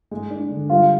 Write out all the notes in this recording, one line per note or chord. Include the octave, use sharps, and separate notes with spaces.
G#3
D4
D3
G3 F4